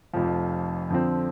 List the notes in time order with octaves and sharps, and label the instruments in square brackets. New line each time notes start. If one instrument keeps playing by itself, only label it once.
[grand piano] F1 F2 F3
F2 D3 F3 C4